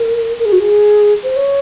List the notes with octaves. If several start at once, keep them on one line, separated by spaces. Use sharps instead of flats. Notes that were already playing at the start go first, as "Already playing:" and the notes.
Already playing: A#4
A#4
G#4
F#4
G#4
C5
C#5